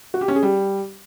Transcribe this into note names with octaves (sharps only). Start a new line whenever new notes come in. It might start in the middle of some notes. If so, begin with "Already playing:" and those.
F#4
G4
C#4
G#4
G3